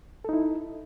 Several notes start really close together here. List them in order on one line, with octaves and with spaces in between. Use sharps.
A4 D#4 E4